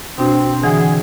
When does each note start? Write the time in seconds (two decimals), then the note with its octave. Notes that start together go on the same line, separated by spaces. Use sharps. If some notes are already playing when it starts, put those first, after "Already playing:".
0.18 B2 C4 D4 F#4
0.63 D3 E3 G#4 F#5